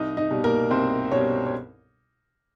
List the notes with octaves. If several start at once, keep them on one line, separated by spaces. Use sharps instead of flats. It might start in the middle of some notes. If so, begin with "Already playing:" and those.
Already playing: C2 D#4 D#5
D#4 D#5
B2 G3
A#3 A#4
C2 C4 C5
B2 G3 C#4 C#5
C#5